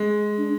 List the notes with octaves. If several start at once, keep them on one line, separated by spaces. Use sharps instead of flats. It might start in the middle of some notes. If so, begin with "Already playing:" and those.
Already playing: G#3
D4